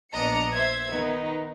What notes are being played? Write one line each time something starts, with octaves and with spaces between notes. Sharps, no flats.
A#1 B3 D4 D#5 A#5 C#7
C5 E5 G#6
D#3 B3 D#4